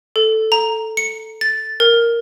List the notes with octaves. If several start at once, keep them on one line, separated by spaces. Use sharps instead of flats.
A4
A#5
C#7
A6
A#4